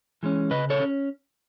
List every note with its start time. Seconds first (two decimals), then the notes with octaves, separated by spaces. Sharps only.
0.23 E3 G#3 C#4
0.51 C#3 B4 D#5
0.70 A4 C#5
0.80 C#4